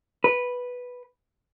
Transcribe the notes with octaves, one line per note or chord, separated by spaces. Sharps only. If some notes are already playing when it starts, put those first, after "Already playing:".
B4